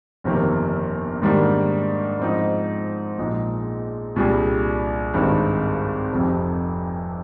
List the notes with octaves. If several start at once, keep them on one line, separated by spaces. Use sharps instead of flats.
G1 F2 C3 D#3 A#3
G#2 D#3 G3 A#3 D4
G#2 F3 C4 D#4
A#1 A#2 G#3 D#4 G#4
C2 A#2 G3 D4 G#4
G#1 G2 D#3 G#3 C4
F1 F2 C3